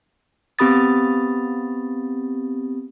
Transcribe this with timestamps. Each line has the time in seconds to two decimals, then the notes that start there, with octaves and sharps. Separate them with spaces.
0.59 B3 C4 G4 B5 D#6 A6